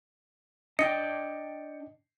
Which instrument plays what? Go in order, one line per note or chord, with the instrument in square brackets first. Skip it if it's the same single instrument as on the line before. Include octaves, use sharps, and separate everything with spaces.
[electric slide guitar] D4 D5 G5 [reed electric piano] D#5 [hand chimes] C#7